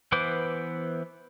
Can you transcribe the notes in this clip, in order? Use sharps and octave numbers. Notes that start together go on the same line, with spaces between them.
E3 B3 B4 C5 D6